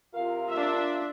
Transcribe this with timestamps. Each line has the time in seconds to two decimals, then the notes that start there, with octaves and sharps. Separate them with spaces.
0.15 C3 E4 F4 A#4 F5
0.50 D4 E5